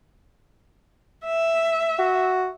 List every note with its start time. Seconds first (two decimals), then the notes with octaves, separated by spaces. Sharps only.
1.25 E5
1.99 F#4